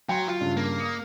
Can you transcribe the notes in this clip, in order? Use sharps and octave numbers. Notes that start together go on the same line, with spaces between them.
F#3 G5 C6
F4
G2 C#3
A#3
D#6 C#7